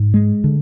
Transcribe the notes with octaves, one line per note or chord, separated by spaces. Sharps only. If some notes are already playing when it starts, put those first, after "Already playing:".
Already playing: G#2
G#3
D3